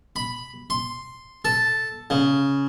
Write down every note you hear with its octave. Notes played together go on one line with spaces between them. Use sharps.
B5
C6
A4
C#3